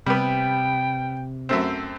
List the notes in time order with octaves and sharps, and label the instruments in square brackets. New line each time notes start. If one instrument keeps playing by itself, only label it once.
[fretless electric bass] C3 [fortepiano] G3 B3 [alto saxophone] G5
[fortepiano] F#2 A3 C4